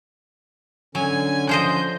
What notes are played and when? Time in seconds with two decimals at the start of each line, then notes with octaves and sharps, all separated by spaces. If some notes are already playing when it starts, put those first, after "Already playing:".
0.95 D3 F#3 C#4 G#5
1.49 F3 C5 D#5 G6